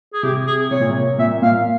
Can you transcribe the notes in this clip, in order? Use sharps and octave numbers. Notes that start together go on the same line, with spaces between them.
G#4
C3 G4
G#4
C3 C#5
A#2
C3
A#2 E5
A#2 F5